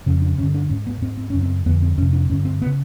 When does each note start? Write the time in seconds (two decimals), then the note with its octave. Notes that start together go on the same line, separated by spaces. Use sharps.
0.06 F2 C#3 C#4
0.22 D4
0.38 G2 C#4
0.43 D3
0.55 D4
0.70 G#2 C#4
0.87 B3
1.02 G#2 C4
1.18 C4
1.30 F#2 C#3 C#4
1.43 C4
1.66 F2 D3 B3
1.82 C4
1.97 F2 C#4
2.01 C3
2.13 D4
2.30 G2 D3 C#4
2.45 C4
2.62 B3
2.66 C#3